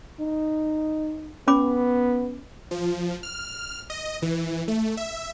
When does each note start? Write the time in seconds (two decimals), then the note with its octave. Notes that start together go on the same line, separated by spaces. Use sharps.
0.20 D#4
1.48 B3 C#4 B5 D6
2.71 F3
3.23 F6
3.90 D#5
4.22 E3
4.68 A3
4.97 E5